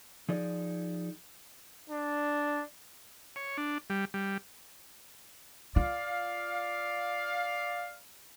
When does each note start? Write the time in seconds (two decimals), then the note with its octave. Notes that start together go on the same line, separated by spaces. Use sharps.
0.29 F3 D#4 G#4 D5
1.90 D4
3.36 C#5
3.57 D4
3.90 G3
4.14 G3
5.76 F4 D5 F5